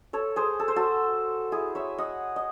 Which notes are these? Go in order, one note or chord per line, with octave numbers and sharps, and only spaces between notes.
A4 C#5
G#4 C5
A4
C5
F#4 A4
E4 G#4
C#5 E5
D#5 F#5
D#5